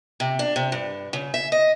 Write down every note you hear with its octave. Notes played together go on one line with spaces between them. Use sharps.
C3
D4
C3
G2
C#3
E5
D#5